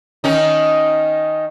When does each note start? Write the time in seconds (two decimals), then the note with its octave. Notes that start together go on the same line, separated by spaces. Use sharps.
0.24 D#3 C#4 D#4